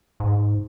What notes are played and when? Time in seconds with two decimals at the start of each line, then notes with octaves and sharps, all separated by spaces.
0.20 G#2